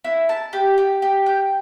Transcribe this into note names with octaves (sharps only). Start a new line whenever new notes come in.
E4
A5
G4
G4
G4
G5